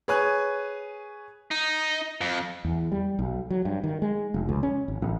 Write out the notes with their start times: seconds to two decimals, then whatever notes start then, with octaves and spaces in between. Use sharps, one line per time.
0.08 G#4 B4 C#5 G#5 F#6
1.51 D#4
2.21 F2
2.64 E2
2.92 G3
3.19 B1
3.50 F#3
3.65 G2
3.84 D#3
4.02 G#3
4.34 F1
4.49 C#2
4.63 C#4
4.88 G#1
5.02 A1